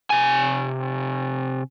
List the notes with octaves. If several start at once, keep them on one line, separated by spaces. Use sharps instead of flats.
C3 G#5